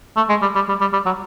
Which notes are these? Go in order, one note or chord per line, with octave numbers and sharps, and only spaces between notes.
A3
G#3
G3
G3
G3
G3
G3
F#3